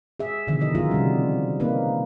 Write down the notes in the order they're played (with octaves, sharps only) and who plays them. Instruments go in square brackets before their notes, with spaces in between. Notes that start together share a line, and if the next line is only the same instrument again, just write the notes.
[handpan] G#4 E5
B2 D3 D#3 F3 E5
B2 E3 D#4 E4 D#5
F#3 B3 D#4 F4 G#4 E5
C3 F3 G3 C#4
A#3 C4 D#4 B4